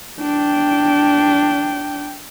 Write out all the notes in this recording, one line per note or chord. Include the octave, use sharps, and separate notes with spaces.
D4 G5